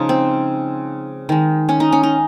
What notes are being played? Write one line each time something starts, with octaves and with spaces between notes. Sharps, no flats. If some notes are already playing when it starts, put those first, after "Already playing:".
Already playing: C#3 F3 G#3 D#4 F4
C4
D#3 G#3
C#4
D#4
C#4
D#4